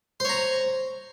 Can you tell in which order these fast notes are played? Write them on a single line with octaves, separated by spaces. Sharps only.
C5 C#5 A#5